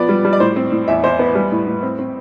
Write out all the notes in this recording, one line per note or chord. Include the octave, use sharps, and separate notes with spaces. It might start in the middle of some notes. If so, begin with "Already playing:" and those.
Already playing: F3 B3 D5
G3
G3
D5
A2 C5
C4
A2
E2 E5
E2 C5
B3 B4
G3
A2
A2
C4
C4